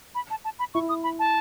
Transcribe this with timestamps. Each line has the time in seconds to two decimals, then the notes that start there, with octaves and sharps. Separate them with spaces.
0.15 B5
0.30 A5
0.44 A5
0.59 B5
0.74 E4 C#6
0.89 D#6
1.03 B5
1.19 A5